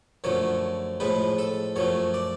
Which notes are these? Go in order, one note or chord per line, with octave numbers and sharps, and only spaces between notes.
F#2 D3 F3 A3 C#5
A2 F3 G#3 B4
A4
F#2 F3 A3 C#5
D5